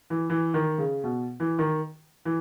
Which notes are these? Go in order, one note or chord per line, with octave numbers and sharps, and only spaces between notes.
E3
E3
D#3
C#3
B2
E3
D#3
E3